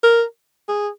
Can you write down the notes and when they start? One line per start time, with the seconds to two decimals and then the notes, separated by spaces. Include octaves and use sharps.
0.04 A#4
0.69 G#4